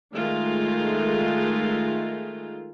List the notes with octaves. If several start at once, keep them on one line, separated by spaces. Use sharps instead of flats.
D#3 G#3 A3 F4